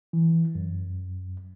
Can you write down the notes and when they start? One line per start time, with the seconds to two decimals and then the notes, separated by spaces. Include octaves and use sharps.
0.13 E3
0.55 F#2